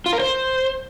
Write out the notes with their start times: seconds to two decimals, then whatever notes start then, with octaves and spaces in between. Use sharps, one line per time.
0.06 F4
0.13 A#4
0.20 C5